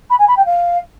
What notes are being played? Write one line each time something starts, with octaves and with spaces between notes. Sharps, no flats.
B5
G#5
B5
G5
F5